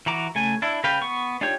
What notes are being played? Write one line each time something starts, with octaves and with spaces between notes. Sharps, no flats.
E3 F#4 A#5 D6
C#3 A3 G#5
D4 E4
C#3 B4 F5 G5
B3 C#6
D4 D#4 F4 G4 C#5